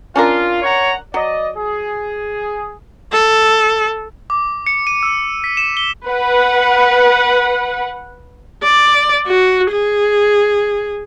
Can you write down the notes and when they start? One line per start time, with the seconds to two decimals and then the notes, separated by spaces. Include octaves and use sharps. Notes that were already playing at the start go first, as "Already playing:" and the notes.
0.16 C#4 D4 F4 A#4
0.62 C#5 F#5 A#5
1.14 F#3 D5 D#5
1.57 G#4
3.12 A4
4.30 D6
4.66 C#7
4.87 D#7
5.03 E6
5.44 B6
5.57 E7
5.77 G7
6.06 B4 F#5
8.63 D5
9.27 F#4
9.71 G#4